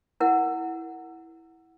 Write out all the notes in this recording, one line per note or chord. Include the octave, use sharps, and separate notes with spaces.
E4 A#4 F#5